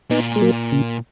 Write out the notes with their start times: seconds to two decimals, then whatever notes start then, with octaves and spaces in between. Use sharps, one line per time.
0.10 A#2 B3 D#4
0.36 G#3
0.42 F#3 A#3
0.72 C#3